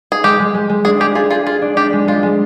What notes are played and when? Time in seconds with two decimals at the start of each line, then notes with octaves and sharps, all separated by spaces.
0.12 G#4
0.24 G#3 G4
0.39 G#3
0.54 G#3
0.69 G#3
0.85 D4 G#4
1.00 G4 G#4
1.15 F4 G#4
1.31 F4 G#4
1.46 F4 G#4
1.62 D4
1.77 D4 G4
1.93 G#3
2.08 G#3 F4
2.23 G#3